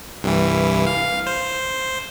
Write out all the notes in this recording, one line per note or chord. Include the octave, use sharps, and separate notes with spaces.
C2 G2 E3
F5
C5